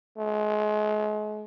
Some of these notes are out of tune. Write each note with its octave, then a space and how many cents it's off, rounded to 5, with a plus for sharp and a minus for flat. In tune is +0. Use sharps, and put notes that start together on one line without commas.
G#3 +35